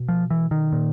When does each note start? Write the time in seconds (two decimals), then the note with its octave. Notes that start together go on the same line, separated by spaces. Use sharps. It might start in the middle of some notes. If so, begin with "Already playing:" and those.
Already playing: B2
0.08 F3
0.30 E3
0.51 D#3
0.72 A#2